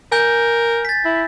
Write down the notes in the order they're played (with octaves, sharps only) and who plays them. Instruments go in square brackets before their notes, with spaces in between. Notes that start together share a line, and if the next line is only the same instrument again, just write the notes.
[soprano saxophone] A#4 [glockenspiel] G#5 G6
[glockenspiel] A6 B6
[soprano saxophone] E4